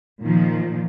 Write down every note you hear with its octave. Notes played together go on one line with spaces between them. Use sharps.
A#2 D#3 F3